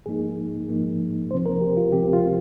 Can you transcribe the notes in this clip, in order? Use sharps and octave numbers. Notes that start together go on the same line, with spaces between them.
G#2 F3 A#3 D#4 G#4
G#2 F3 A#3 D#4
D2 C3 F3 C4 C5
A#4
G4
F4
D2 C3 F3 C4 G4
F4